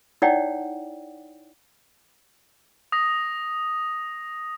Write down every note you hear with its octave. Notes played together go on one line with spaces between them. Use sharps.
D#4 E4 C#5 D5 F#5 G5
D#6 A#6